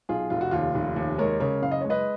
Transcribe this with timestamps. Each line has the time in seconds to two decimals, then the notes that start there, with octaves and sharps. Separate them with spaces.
0.09 B1 F4 G#4
0.30 F1 F4
0.41 F#4
0.51 D#2 F4
0.75 F1
0.96 D#2
1.18 G#3 A#4 C#5
1.40 C#3 A#4 C#5
1.62 F#1 F5
1.71 D#5
1.81 G#3 C#5
1.90 B4 D#5